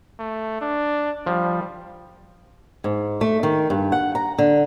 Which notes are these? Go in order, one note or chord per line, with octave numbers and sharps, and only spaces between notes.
A3
D4
F3 G3
G#2
A3
D#3
G2
F#5
A#5
D3